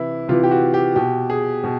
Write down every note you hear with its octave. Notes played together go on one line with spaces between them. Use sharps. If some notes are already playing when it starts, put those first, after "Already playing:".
Already playing: C3 E3 E4
C3 E3 F4
G4
F#4
G4
B2 G4
G#4
B2